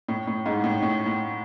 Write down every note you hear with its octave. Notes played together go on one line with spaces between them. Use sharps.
A2
A2
G#2
A2
A2
A2